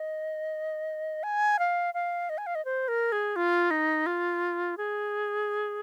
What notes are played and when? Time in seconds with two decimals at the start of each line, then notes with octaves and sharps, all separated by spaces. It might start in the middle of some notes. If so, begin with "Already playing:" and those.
Already playing: D#5
1.23 G#5
1.59 F5
1.94 F5
2.29 D#5
2.38 G#5
2.47 F5
2.55 D#5
2.65 C5
2.88 A#4
3.12 G#4
3.36 F4
3.71 D#4
4.06 F4
4.78 G#4